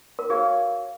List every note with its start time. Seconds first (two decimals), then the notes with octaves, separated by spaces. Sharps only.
0.19 A#4
0.30 F#4 G#4 C#5 F5